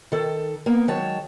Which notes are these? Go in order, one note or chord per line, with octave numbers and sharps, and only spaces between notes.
D#3 A4
A#3 B3
D#3 F#3 G#3 C#5 A5